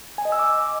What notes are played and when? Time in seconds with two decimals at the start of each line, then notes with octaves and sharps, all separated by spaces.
0.18 G#5
0.25 D#5
0.32 E6
0.39 D6